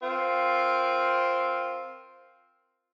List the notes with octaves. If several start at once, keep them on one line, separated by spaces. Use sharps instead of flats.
C4 F4 A#4